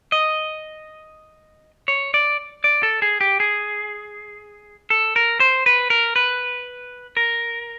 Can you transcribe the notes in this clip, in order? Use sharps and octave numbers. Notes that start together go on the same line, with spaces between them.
D#5
C#5
D5
D5
A4
G#4
G4
G#4
A4
A#4
C5
B4
A#4
B4
A#4